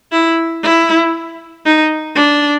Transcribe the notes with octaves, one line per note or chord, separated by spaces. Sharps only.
E4
E4
D#4
D4